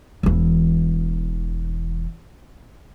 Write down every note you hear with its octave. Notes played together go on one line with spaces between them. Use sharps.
E1 E3